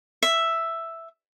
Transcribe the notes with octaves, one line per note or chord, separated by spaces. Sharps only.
E5